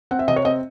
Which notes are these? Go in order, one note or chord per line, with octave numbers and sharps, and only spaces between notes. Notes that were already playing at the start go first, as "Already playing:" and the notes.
C4 F#5
E5
C3 D#5
C#5
C4 D#5